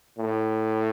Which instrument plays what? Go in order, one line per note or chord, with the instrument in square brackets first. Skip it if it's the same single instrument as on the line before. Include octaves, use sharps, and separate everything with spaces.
[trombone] A2